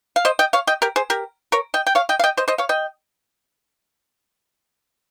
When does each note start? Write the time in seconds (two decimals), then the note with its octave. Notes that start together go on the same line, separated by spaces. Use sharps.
0.16 F5
0.25 C5 D#5
0.39 D#5 G5
0.53 C#5 F5
0.67 D#5 G5
0.82 G4 A#4
0.96 G#4 C5
1.10 G4 A#4
1.52 A#4 C#5
1.74 D#5 G5
1.87 G5
1.95 C#5 F5
2.09 D#5 G5
2.19 F5
2.24 D#5 G5
2.37 C5 D#5
2.48 C5 D#5
2.58 C#5 F5
2.69 D#5 G5